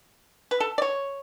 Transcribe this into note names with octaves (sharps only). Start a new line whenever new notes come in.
B4
A4
D5
C#5